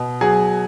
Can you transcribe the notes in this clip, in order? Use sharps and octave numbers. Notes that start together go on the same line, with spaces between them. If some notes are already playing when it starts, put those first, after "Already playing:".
Already playing: B2
F#3 G#4